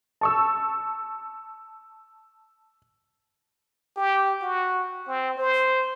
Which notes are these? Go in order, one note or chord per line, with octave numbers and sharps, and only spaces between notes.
A5 C#6 E6
G4
F#4
C4
C5